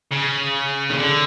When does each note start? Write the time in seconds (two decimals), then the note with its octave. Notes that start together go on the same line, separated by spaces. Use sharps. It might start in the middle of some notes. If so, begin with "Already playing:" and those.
0.11 C#3
0.90 D#3
0.97 D3